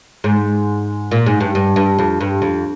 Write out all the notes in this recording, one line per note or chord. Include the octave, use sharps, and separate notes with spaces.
G#2
A#2
G#2
G2
G2
G2
F2
G2
F2